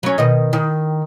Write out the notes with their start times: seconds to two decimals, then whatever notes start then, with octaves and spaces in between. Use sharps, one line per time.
0.03 F#3 C#4
0.18 B2 D#3 D#5
0.53 D#3